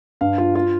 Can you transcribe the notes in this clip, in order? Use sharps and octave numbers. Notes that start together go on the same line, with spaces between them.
G2 F5
F4
F4